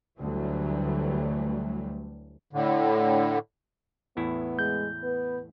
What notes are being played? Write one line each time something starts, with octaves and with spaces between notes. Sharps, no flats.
D2 E3 F#3 G3 A3
A2 D3
E2 A2 B3 E4
G#3 G6
B3 B4